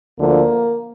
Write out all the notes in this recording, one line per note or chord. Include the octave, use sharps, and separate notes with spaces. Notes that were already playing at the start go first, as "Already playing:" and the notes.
D2 D3 F3 A#3